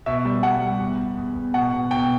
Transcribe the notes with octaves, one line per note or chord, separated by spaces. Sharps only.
B2 E5
G3
G3 F#5
G3
E2
E2
E2
E2
B2 F#5
B2
B2 G5